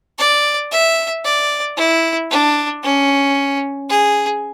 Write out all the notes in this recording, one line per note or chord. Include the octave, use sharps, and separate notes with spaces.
D5
E5
D5
E4
D4
C#4
G#4